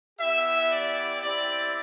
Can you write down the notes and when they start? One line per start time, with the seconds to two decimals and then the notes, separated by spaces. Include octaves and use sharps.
0.19 B3 E4 G4 E5
0.71 D5
1.22 C4 E4 G4 D5